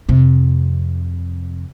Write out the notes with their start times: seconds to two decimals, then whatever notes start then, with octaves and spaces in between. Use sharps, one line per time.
0.09 F2 C3